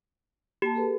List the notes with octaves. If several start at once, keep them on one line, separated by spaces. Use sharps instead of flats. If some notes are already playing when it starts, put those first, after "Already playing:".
A#3 G4 A5
G#4 A4 B4